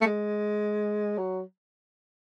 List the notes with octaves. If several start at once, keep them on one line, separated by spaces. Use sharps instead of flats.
A3
G#3
F#3